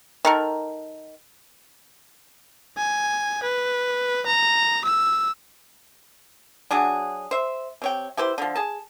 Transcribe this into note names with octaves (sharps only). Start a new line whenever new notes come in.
D#3 A4 A#4
G#5
B4
A#5
E6
F#3 D4 F#4 G#4
C5 E5
C3 C#5 G5
E4 G4 B4 C5
D3 F3
G#4 A5